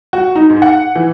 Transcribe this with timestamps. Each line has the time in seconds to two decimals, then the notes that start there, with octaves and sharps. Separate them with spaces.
0.13 F#4
0.36 D#4
0.50 G#2
0.62 F#5
0.95 E3